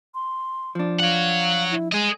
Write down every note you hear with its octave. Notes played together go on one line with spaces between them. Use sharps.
C6
F3 D4
C#5 F5 F#5
E4
G#3 G#4 D#5